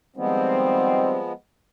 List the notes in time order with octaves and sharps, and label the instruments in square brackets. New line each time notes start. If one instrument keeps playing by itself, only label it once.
[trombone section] D#3 G3 C4 [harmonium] F3 G#3 B3